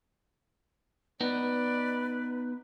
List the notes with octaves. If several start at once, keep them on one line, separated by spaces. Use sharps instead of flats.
B3 D#4 B4 D5